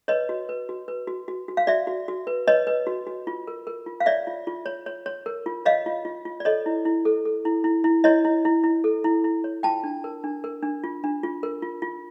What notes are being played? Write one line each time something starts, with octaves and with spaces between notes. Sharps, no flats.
B4 C#5 D#5
F#4
B4
F#4
B4
F#4
F#4
F#4
F5
F#4 D5 E5
F#4
F#4
B4
B4 C#5 D#5
B4
F#4
F#4
F4
A#4
A#4
F4
F5
C#5 D5 E5
F4
F4
C#5
C#5
C#5
A#4
F4
C#5 D#5 F5
F4
F4
F4
D5
A4 C#5 D#5
E4
E4
A4
A4
E4
E4
E4
E4 C#5 D#5
E4
E4
E4
A4
E4
E4
C#5
F4 G5 A5
D4
A#4
D4
A#4
D4
F4
D4
F4
A#4
F4
F4